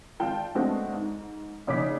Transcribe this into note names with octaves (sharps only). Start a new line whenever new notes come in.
G#1 F4 G5 A5
G#3 A3 B3 C4 D4 F#4
G#2
A#1 C#3 D#4 D6 B6